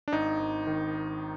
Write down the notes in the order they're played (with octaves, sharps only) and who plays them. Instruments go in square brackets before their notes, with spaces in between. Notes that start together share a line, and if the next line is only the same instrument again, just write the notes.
[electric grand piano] D4
G#1 D#4
G#1
D#3